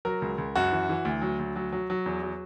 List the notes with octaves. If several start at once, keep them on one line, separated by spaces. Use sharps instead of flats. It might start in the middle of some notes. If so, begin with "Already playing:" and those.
F#3 A#4
C#2
C#2
F#2 F#4
E3
E3
D2
F#3
D2
F#3
F#3
F#3
E2
F#3